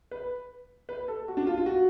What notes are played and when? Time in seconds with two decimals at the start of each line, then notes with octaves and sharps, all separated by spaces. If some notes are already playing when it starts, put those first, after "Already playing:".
0.11 B4
0.89 B4
1.08 A4
1.28 F#4
1.37 D4
1.47 F4
1.57 F4
1.66 F#4